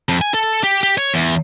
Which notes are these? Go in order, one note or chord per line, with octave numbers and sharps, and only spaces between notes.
F2
G#5
A4
G4
G4
C#5
E2